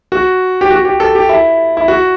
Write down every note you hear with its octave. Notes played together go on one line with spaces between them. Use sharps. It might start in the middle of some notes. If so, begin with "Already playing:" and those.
F#4
G4
F#4
G4
A4
G4
E4
E4
F#4